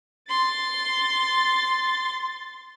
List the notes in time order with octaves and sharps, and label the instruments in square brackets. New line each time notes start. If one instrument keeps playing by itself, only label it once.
[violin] C6 A6